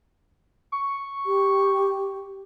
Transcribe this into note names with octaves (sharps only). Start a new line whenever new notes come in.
C#6
G4